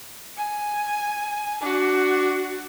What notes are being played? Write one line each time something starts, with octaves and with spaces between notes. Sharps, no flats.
G#5
D4 F#4